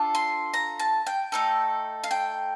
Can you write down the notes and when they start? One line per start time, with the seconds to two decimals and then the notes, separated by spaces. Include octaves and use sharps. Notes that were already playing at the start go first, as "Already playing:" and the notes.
Already playing: D4 F4 A4
0.15 C6
0.54 A#5
0.79 A5
1.07 G5
1.32 A3 D#4 A4
2.04 F5
2.11 G5